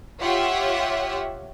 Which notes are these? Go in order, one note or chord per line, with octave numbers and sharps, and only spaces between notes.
F4 G4 C#5 E5 F#5